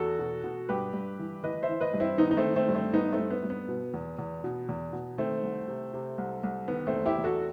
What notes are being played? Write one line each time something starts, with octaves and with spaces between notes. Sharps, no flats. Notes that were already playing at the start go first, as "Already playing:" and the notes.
Already playing: E2 F#4 A4
B2
B2
G2 G4 B4
G2
E3
E3 B4 D#5
C5 E5
E3
B4 D#5
G2
C4 E4
D#3 B3 D#4
D#4
A3 C4
D#3
A3 C4
G2
A3 C4
G2 B3 D#4
A3 C4
G2
B3
G2
B3
B2
E2
E2
B2
E2
B2
D#3 A3 C4
C2
C3
C3
C2
C2
D#3 B3
A3 C4
E2
E4 G4
E2
F#4 A4